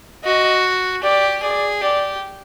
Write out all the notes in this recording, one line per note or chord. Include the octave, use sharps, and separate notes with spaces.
F#4 D#5
G4 D5
G#4 D5
G4 D5